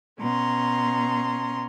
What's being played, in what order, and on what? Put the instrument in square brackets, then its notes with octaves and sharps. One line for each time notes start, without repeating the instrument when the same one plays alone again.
[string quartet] B2 C#4 A#5 C6